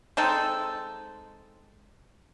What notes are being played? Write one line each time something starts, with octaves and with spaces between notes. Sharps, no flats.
G#3 C4 D#4 A4